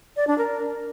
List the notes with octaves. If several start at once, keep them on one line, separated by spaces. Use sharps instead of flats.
D5
D4
A#4